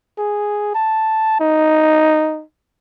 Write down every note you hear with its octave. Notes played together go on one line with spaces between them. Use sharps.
G#4
A5
D#4